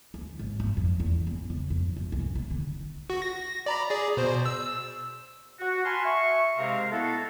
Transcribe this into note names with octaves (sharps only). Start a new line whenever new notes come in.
D2
G#1
G2
F2
E2
B3
C#3
F2
F#2
C2
B1
D3
F#4
A#6
D5 A#5 B5
G#4 D5
B2 C5
E6
F#4
G#5 A5 B5 C6 F6
E5 C#6
G#2 C3 G#3 C4 A#4 F5
A3 B3 E4 F#4 A4